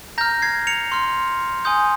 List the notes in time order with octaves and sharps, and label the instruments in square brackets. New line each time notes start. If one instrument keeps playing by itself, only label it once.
[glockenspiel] A#5 G6 A#6
F6
G#6 C7
C#7 F7
C6 F6
G#5 C6 D#6 G6